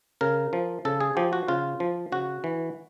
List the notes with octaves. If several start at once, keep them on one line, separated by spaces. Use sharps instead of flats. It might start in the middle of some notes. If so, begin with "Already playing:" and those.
C#3 A#4
F3
C#3 A4
G#4
F3 G4
F#4
C#3 F4
F3
C#3 F#4
E3